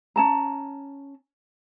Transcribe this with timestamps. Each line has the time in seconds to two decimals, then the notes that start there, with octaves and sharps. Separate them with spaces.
0.16 C#4 A5 A#5